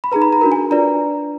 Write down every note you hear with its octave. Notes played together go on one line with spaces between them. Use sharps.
B5
D#4 G#4 B4 A#5
B5
A#5
D4 F#4 A#4
G#5
D4 F4 B4 D5 A#5